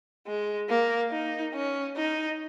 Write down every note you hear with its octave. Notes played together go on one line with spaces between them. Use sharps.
G#3
A#3
D#4
C#4
D#4